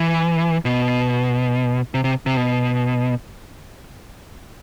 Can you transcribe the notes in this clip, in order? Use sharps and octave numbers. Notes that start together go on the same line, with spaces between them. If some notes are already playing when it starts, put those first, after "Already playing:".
Already playing: E3
B2
C3
C3
C3
B2